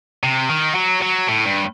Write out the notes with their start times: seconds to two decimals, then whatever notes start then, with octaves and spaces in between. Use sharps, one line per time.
0.23 C3
0.49 D#3
0.75 F#3
1.02 F#3
1.28 A2
1.45 G2